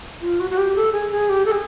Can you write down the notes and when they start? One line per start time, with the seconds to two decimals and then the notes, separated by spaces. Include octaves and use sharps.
0.21 F4
0.40 F#4
0.51 F#4
0.58 G4
0.75 A4
0.92 G#4
1.11 G#4
1.29 G4
1.45 A4
1.52 G#4